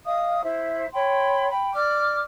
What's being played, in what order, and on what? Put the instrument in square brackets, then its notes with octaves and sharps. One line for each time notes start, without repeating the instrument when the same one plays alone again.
[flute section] D#5 F5 D#6
E4 C5 E5
C#5 G5 B5 C6
G5 B5
D5 D6 F6